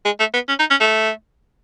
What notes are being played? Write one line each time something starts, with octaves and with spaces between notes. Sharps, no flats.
G#3
A3
B3
C#4
D#4
C#4
A3